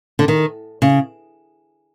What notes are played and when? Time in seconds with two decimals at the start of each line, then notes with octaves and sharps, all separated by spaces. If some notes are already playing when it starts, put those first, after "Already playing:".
0.19 D3
0.28 D#3
0.82 C#3